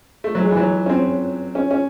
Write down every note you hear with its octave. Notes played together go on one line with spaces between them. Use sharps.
A3
F#3
G#3
E3
F#3
C#4
C4
C#4
C#4